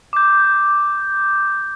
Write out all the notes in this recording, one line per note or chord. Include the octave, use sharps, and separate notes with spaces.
D6 G6